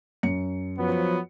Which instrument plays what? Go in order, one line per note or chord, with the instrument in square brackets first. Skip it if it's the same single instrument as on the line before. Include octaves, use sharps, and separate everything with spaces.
[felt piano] F#2 C#7
[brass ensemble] F3 F#3 B3